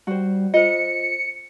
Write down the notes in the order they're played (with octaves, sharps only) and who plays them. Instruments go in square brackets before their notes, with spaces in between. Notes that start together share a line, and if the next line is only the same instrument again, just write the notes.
[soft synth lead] G3 [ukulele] F#4 C5
[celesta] F4 C5 [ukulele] D#5 [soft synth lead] C#7